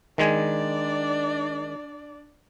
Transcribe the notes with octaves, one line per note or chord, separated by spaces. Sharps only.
D#3 G#3 D4 D5 G#5